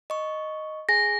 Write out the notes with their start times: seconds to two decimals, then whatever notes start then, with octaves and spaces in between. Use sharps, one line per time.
0.10 D#5 C#6
0.89 G#4 G#5 A#6